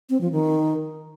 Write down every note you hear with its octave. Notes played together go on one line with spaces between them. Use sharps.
C4
F3
D#3